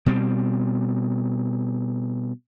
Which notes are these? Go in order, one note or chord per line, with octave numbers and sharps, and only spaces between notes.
B2 G3 C4